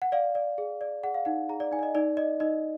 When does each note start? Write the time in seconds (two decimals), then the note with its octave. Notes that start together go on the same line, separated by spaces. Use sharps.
0.02 F#5
0.12 D5 F5
0.35 D5
0.58 G#4
0.81 D5
1.03 G#4 F#5
1.14 F5
1.25 D#4 F#5
1.49 G#4 A#5
1.60 D5
1.71 D#4 G#5
1.79 D5
1.83 D#5
1.95 D#4 D5
2.17 D5 D#5
2.40 D#4 D#5